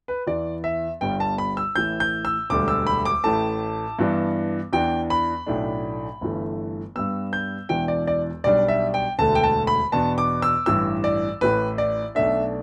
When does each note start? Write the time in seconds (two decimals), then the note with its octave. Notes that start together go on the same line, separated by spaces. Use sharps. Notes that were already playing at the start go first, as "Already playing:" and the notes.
0.08 B4
0.27 E2 E3 B3 D5
0.64 E5
1.01 G1 G2 G3 B3 G5
1.20 A5
1.38 B5
1.57 E6
1.76 A1 A2 E3 G6
2.00 G6
2.25 E6
2.50 E1 D2 D3 G3 D6
2.68 E6
2.87 B5
3.05 D6
3.24 A1 A2 A3 A5
3.99 G2 E3 B3 D4
4.73 E2 E3 B3 D4 G5
5.10 B5
5.46 B1 A2 A3 D4
6.21 G1 G2 E3 A3
6.96 G2 G3 B3 E6
7.33 G6
7.69 E1 E2 E3 B3 D4 G5
7.88 D5
8.07 D5
8.44 B1 B2 G3 D4 D5
8.68 E5
8.94 G5
9.18 E1 D2 D3 A3 A5
9.35 G5
9.43 A5
9.67 B5
9.92 E2 B2 B3 D4 A5
10.18 D6
10.42 E6
10.66 A1 G2 E3 E6
11.04 D5
11.41 A1 A2 E3 B4
11.78 D5
12.15 B1 B2 A3 D4 E5